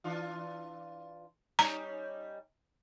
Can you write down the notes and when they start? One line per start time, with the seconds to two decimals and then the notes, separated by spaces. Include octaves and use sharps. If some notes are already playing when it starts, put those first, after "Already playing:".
0.04 E3 D4 F4
1.59 G3 C#4 D#4 A#5